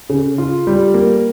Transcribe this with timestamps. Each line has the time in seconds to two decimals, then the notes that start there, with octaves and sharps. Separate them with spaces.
0.09 C#3
0.38 F4
0.67 G3
0.94 A#3